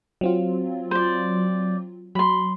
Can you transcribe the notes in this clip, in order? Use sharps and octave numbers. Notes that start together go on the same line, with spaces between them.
F#3 C4 F4
C5 D5
F#3 B5 C6